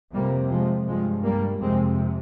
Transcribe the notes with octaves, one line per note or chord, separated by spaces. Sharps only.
F2 C3 G3 A#3
F3 G#3
G2 F3 G#3
G3 A#3
F2 C3 G#3 C4